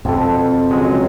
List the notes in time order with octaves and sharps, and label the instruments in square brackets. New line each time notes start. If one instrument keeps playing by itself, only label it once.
[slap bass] F2 B2 [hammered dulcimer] C4 A4
[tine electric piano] C#2 F#3 G#3